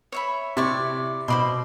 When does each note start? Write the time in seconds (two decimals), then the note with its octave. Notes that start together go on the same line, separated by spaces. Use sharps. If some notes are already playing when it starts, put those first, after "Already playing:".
0.12 C#5 E5 B5
0.57 C3 E4 D5 C#6
1.28 B2 C5 B5 C6 D6